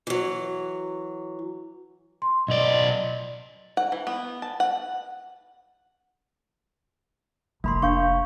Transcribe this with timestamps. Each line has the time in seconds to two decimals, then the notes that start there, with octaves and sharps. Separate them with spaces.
0.07 E3 F#3
2.22 C6
2.48 B1 D5 D#5
3.77 F#5
3.92 E3
4.07 B3
4.42 A5
4.60 F#5
7.64 F1 A#3 B5 C6
7.82 D4 F5 C#6 G6